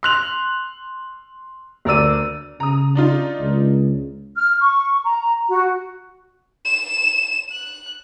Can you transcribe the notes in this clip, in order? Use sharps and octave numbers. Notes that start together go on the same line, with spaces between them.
C6 F#6 F7
D2 A#4 D5 E6 D#7
C#3 A#5 D#6
D4 D#4 F4
C#2
F6
C#6
A#5
F#4
E7
F#6